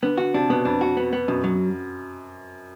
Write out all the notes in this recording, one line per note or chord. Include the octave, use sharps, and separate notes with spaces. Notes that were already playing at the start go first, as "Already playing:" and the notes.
D3 B3
D3 F#4
C3 D4
B2 B3
F2 D4
F#4
B3
B3
F#2 B2
F#3